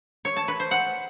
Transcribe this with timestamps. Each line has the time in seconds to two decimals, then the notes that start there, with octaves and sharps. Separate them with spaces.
0.25 C#5
0.36 A5
0.48 B4
0.60 C5
0.71 F#5